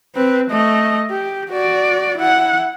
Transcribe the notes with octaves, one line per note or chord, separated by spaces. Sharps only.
C4 B4
A3 D#5
G4
F#4 D5
E4 F#5